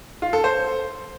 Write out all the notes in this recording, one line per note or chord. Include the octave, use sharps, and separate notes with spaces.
F4
A4
C5